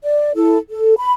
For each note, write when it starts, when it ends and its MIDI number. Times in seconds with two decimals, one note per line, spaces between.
0.03 0.31 74
0.34 0.58 64
0.34 0.58 69
0.70 0.94 69
0.97 1.12 83